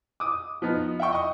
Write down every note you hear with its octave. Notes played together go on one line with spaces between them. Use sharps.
D6 D#6
F3 B3 D#4
E5 F#5 G5 C#6
D#5 C#6